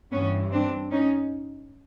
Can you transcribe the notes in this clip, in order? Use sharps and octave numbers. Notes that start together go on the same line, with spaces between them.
G2 E3 B3 C#4
C4 D4
C#4 D#4